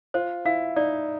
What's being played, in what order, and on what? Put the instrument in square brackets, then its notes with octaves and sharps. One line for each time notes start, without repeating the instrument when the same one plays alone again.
[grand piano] F4 [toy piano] C5
[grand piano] E4 [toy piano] F5
[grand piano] D#4 [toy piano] D5